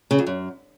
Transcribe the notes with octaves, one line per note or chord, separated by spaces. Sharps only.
C#3
F2
F#2